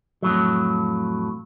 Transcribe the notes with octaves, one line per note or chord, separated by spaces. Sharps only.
F2 A2 F#3